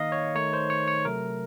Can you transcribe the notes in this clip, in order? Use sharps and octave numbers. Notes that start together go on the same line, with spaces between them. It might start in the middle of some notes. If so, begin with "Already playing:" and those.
Already playing: D#3 A#3 D#4 D#5 F5
C#5
D#3 A3 D#4 C#5
C5
C#5
C#5
C3 F#3 A3 A#4